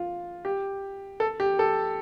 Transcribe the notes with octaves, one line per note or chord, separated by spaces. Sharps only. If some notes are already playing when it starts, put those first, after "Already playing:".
Already playing: F4
G4
A4
G4
A4